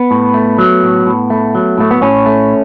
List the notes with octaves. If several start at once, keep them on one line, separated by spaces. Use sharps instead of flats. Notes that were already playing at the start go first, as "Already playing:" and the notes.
Already playing: B3
A2
A3
F#3
A2
A2
A3
F#3
A2 A3
B3
A2 C#4
A3